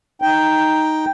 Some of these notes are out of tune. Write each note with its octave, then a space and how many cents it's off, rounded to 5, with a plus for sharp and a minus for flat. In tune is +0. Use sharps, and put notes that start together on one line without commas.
D#4 +0 G5 +0